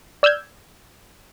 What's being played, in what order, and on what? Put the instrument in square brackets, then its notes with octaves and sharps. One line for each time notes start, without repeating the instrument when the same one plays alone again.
[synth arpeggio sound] D5 E6 F6 G6 G#6